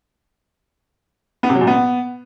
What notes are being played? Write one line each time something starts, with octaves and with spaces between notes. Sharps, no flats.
B3
C3
F#3
A#2
B3